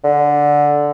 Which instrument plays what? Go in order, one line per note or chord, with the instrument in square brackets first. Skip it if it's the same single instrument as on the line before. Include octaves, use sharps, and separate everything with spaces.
[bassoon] D3